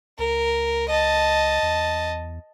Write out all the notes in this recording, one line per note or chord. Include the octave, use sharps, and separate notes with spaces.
C#2 A#4
D#5 A5
E2